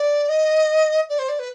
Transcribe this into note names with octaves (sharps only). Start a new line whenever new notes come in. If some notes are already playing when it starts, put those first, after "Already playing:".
Already playing: D5
D#5
D5
C5
D5
B4